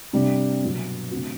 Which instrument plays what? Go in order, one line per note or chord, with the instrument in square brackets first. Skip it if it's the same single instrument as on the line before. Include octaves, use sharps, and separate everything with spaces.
[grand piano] C3 G3 D4
B2 F#3 B3
D3 A3 C4 F#4